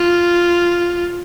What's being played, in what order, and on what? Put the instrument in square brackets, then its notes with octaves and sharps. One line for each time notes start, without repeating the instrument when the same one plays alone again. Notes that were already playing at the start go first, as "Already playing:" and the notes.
Already playing: [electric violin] F4